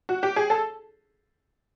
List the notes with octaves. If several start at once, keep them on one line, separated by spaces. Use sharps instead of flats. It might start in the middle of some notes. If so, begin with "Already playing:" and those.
F#4
G4
G#4
A4